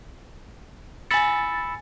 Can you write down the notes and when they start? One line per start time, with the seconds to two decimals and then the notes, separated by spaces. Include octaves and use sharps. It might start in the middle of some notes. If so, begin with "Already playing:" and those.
1.11 G#5 B5 E6 A6 C#7